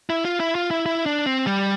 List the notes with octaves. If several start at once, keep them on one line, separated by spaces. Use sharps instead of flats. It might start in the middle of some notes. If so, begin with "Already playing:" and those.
E4
F4
E4
F4
E4
E4
D4
C4
G3